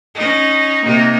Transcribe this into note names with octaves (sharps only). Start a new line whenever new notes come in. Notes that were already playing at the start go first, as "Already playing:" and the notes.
C#4 D#4
C3 A#3 D#4